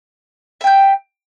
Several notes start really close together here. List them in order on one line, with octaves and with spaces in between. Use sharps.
E5 G5 G6